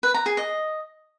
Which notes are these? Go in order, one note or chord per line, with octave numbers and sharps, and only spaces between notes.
B4
A#5
G#4
D#5